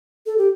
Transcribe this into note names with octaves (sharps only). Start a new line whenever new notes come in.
A4
G4